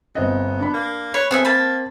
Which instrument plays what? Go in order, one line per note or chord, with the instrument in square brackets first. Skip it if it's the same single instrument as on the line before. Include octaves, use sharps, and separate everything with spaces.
[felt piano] G1 C4 D#5 [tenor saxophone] B3
[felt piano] D4 B5
[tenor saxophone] A#3
[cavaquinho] B4 [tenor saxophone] C#5
[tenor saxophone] B3 [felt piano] C4 [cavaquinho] G#4 A4 E5
[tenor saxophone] A#3 [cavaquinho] A5 B5